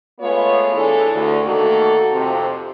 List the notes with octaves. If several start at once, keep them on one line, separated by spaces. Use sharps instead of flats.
G#3 A3 B3 F4 B4 C#5
E3 D4 E4 G#4 A4
D2
D#3 A3 A#3 F#4 A4
F2 C3 C4